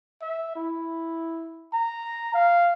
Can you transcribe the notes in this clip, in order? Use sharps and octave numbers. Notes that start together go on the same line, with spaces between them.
E5
E4
A#5
F5